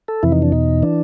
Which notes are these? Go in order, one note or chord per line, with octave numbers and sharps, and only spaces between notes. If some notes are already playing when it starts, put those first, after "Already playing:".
A4
F2 C3 E3 E4
D#4
D4
E2 B2 D#4
E3 D4